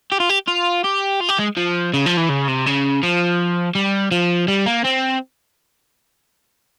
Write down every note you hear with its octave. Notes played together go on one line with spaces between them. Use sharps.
G4
F4
G4
F4
G4
F4
G4
G#3
F3
C#3
F3
E3
C#3
C3
C#3
F3
G3
F3
G3
A#3
C4